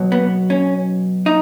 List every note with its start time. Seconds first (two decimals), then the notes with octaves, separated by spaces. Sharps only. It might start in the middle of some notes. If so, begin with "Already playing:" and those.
Already playing: B2 F#3
0.12 B3
0.50 C#4
1.26 D#4